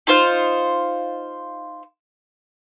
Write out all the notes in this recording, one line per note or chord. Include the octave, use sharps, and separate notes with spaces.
D#4 F4 C5 F5